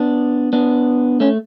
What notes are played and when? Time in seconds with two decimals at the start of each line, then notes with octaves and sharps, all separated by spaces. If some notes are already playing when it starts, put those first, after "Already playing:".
Already playing: B3 D4
0.53 B3 D4
1.20 A3 C#4